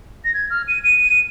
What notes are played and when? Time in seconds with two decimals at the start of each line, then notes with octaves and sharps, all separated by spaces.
0.24 A#6
0.34 G#6
0.50 F6
0.68 D#7
0.83 D#7